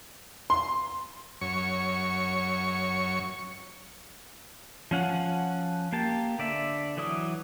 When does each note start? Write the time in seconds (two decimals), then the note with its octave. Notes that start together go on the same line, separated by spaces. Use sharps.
0.50 C6
1.41 F#2 C#5 C#6
4.91 F3 C#4 F#5
5.92 A#3 G4 A5
6.39 D3 D5 E5
6.97 E3 F#3 D6 D#6